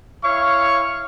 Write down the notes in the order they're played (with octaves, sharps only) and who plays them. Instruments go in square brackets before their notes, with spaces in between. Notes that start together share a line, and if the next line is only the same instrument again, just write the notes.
[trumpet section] E4 C#5 F5 C#6